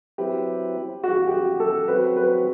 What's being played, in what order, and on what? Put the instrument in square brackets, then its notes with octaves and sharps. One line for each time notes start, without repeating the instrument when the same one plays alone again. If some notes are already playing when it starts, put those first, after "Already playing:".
[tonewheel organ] F#3 C4 E4 B4 [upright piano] G4
[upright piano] F#4
G4
F#4
A4
[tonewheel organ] F#3 C4 F#4 [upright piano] B4
[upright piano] B4